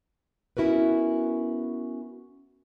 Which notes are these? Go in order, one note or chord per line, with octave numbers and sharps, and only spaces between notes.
B3 C#4 E4 F#4 A#4 B4